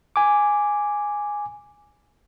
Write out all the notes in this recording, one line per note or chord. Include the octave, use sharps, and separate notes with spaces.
G#5 D6